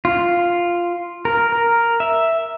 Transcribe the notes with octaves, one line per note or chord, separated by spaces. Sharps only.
F4
A#4
A#4
E5